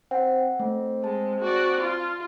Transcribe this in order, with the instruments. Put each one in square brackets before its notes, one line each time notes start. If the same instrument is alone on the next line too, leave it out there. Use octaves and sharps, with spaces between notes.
[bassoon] C4 [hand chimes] F#5
[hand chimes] A3 [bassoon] C4
[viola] G#3 [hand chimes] A5
[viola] F#4 D5
F4